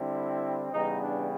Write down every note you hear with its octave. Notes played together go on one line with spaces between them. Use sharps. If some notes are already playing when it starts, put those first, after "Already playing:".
Already playing: D3 G3 C4 E4
C#3 E3 G3 B3 D#4
D4